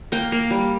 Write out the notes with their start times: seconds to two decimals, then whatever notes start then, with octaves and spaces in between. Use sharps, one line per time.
0.12 A#3 G5
0.32 A#3
0.50 G3